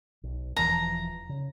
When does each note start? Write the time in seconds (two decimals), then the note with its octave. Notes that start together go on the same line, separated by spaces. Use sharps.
0.23 B1
0.56 E1 E3 F3 A#5
1.29 C#3